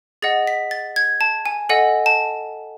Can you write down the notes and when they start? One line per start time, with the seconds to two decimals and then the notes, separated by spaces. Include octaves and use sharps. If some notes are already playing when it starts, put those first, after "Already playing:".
0.22 G#4 D#5 F#5 A6
0.47 B6
0.71 A6
0.96 G#6
1.21 A5
1.46 G#5
1.69 A4 D#5 F#5 G#5
2.06 A5